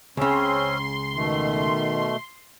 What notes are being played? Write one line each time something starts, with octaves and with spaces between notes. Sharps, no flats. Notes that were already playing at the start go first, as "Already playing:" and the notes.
C#2 C#3 C4 C#4 C6
B2 D#3 A3